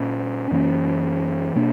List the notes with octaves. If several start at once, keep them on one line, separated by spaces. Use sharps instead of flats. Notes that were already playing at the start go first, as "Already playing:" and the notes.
Already playing: A#2 A#3 C#4
F#2 E3 A#3 C#4
B2 A#3 D4